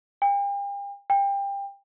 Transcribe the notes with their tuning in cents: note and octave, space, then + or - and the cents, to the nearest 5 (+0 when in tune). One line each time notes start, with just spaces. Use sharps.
G5 +40
G5 +25